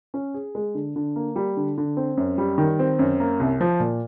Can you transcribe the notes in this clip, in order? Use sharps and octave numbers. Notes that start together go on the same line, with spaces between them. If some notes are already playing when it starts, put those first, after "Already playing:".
C#4
G#4
G#3
D3
D3
A#3
G3
D3
D3
C4
F#2
G3
D#3
C4
F#2
A#3
C2
F3
A#2